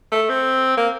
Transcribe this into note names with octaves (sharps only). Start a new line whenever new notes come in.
A3
C4
A#3